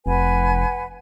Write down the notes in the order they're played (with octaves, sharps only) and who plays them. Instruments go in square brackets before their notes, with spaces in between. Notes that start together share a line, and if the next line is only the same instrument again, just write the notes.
[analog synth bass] F1 [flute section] B4 F#5 G#5